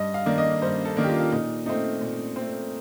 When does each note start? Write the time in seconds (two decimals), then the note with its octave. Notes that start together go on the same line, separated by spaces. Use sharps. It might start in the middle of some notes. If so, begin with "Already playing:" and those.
Already playing: G2 D#5
0.14 F5
0.26 D#3 A#3 D4
0.38 D#5
0.62 G2 C5
0.85 A4
0.96 D#3 A#3 D4
1.04 G4
1.09 F4
1.20 F4
1.32 A#2 D#4
1.66 A3 C4 D#4
2.01 A#2
2.36 C4
2.41 A3